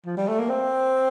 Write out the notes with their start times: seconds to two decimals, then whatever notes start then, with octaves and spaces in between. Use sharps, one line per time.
0.06 F3
0.17 G3
0.28 A3
0.39 A#3
0.49 C4